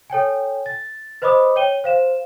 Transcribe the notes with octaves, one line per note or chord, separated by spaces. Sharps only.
A4 C#5 G5 G#5
A6
B4 C5 D#5 B5 D6 D#6
C#5 G5 D#7 G7
C5 F5 E7